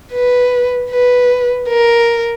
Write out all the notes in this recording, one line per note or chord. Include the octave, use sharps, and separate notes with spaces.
B4
B4
A#4